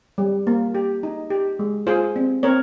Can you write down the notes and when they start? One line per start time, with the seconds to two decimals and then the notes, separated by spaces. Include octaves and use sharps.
0.18 G3
0.47 A#3
0.75 G4
1.03 D#4
1.30 G4
1.59 G#3
1.87 F4 G#4 C5
2.16 C4
2.43 C4 A#4 C#5